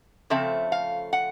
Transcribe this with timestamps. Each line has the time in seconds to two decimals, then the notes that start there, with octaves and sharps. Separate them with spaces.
0.30 C#3 F3 A3 C4 E5
0.72 F5
1.13 F#5